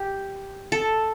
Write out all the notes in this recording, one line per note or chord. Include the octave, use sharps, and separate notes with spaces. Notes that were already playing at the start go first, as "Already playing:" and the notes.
Already playing: G4
A4